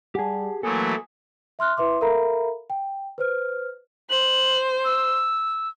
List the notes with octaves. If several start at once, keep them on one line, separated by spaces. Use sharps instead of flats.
G3 G4 G#4 F#5 G#5 A5
E3 F#3 A3 A#3 A4 G#5 D#6
E5 C6 F6 F#6
E4 B4 E5 C6 D6
A4 A#4 E5 F5 A#5 B5
G5
B4 C5 F6
C5 F#7
E6